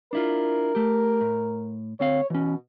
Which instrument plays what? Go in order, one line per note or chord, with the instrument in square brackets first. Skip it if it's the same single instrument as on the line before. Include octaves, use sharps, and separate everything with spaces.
[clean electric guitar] D4 E4 F4 [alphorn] A#4
[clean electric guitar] A3 G4
A2
[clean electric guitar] D2 C4 F5 [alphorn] C#5
[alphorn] B2 [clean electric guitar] E3 C#4